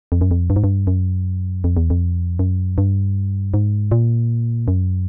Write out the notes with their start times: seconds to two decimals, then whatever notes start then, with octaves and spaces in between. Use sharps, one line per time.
0.12 F2
0.21 F#2
0.31 F2
0.50 G2
0.56 G#2
0.64 G2
0.87 F#2
1.64 F2
1.77 E2
1.90 F2
2.39 F#2
2.78 G2
3.54 G#2
3.91 A#2
4.68 F#2